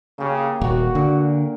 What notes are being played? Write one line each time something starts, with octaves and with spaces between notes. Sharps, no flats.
C#3 A#3 G4 F5
D#1 F#4
A#2 D3